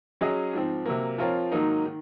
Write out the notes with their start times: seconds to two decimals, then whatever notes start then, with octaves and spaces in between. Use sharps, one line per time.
0.21 F#3 C#4 G#4 D#5
0.53 G#2 F3 C4
0.86 C3 F#3 A#3
1.18 F3 C4 F4 A#4 C#5
1.52 G#2 D#3 F#3 A#3 D#4
1.86 D#3